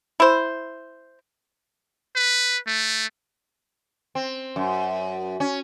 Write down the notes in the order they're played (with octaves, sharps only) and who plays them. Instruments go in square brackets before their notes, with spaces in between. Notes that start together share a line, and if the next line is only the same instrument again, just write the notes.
[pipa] E4 C5
[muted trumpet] B4
A3
[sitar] C4
F#2
C#4